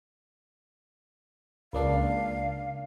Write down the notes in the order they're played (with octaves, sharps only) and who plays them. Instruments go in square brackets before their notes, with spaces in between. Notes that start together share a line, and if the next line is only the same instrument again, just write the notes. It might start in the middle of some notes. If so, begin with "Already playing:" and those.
[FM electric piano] C#2 A#3 D4 [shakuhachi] F5